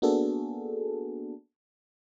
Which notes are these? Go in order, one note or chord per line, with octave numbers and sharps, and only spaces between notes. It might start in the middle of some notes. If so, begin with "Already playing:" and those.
A#3 B3 D4 F#4 G#4 A4